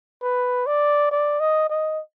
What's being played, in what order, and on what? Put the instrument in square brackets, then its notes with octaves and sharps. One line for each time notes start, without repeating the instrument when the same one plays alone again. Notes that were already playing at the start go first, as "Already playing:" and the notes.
[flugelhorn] B4
D5
D5
D#5
D#5